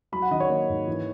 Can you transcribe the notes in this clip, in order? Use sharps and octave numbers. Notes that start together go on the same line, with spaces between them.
F#3 B5
F#5
D#3 D#5
C#5
A#3
G#2
E3